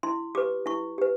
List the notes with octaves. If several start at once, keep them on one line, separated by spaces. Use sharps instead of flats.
E4 C6
G4 B4 D6
E4 C#6
G4 B4